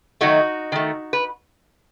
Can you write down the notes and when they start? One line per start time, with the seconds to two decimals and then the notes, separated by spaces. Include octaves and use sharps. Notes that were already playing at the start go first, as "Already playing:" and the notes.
0.21 D#3 F#3 A3 D#4 F#4
0.72 D#3 A3
1.13 B4